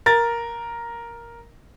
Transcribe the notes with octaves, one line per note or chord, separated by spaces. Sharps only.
A#4 A6